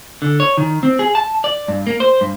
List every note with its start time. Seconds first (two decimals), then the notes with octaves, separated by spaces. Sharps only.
0.22 D3
0.40 C#5
0.58 D#3
0.83 C4
0.99 G#4
1.15 A5
1.44 D5
1.68 G2
1.87 A#3
2.00 C5
2.21 G2